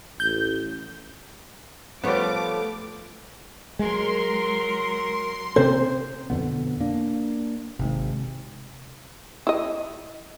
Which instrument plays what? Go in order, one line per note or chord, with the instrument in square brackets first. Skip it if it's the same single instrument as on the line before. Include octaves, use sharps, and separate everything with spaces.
[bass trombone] A1 [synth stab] G6
[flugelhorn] F3 [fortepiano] G3 B3 [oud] A3 C#5 [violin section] D6
[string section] F#3 A#4 [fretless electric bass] G#3 [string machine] C6
[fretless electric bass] C3 C4 C#4 [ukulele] C5
[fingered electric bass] F2 D3 B3 [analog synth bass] B2
[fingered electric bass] A#3 [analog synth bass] D4
[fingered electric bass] G#1 G#2 [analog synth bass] C3
[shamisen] E4 D#5